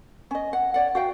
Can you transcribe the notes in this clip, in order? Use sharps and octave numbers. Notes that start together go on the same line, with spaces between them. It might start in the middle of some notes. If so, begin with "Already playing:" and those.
C#4 D#5
F#5
C#5 D5 F#5
F#4 F5 G5